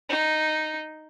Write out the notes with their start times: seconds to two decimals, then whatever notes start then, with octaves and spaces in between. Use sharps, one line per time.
0.09 D#4